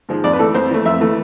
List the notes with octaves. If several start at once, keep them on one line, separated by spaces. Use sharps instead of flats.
G#2 F3 G#3
F2 D5
B4
E3 A3 A4
F2 C5
E3 A3
F2 E5
E3 A3